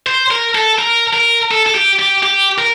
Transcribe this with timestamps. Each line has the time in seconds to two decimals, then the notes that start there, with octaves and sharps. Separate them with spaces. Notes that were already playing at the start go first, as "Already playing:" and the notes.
0.07 C5
0.31 A#4
0.55 A4
0.79 A#4
1.14 A#4
1.51 A4
1.66 A4
1.74 G4
1.99 G4
2.23 G4
2.58 A#4